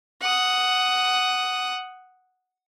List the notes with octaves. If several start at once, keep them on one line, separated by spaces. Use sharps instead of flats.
F#5 D#6